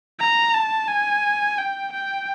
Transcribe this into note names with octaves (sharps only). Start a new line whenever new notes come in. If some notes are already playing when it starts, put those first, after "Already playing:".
A#5
A5
G#5
G5
G5